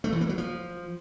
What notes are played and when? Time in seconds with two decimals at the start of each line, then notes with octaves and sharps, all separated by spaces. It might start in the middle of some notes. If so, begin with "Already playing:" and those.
0.04 A3
0.12 E3
0.21 A#3
0.29 F#3
0.38 F3